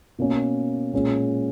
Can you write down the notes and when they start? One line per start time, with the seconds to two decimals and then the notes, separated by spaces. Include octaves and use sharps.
0.19 B2 A#3 C#4
0.93 A#2 G#3 C#4